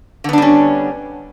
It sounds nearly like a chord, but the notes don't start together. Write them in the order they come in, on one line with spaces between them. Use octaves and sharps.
D3 B3 D4 G3 C#4